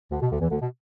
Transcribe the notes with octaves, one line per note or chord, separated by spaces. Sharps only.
D2 D3
B2
D2 D3
E2 E3
D2 D3
B2